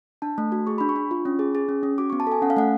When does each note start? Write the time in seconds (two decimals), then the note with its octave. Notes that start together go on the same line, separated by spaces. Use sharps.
0.22 D4 A5
0.38 A3
0.52 F#4
0.67 G#4 C#6
0.78 D4 B5
0.89 C#6
0.96 D4
1.11 F4
1.25 C#4
1.39 G#4
1.55 G#4
1.69 C#4
1.83 C#4
1.98 F#4 D6
2.10 B3 C#6
2.20 A5
2.27 A4 G#5
2.42 C#4 F#5
2.50 F5
2.57 A3 F#5